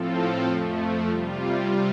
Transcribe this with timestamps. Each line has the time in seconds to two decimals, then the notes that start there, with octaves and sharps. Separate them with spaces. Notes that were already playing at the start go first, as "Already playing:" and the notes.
Already playing: A2 F3 C4 F4 A4
0.46 F2 F3 A3
1.08 C3 G3 F4